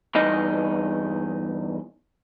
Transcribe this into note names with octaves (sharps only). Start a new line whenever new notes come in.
E2 G2 D#4 D#5